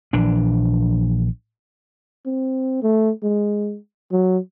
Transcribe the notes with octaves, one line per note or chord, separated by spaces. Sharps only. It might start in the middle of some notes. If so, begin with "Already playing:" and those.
A#1 E3 D4
C4
A3
G#3
F#3